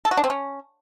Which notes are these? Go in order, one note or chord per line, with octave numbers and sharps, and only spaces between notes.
A4
F#4
D4
C4
C#4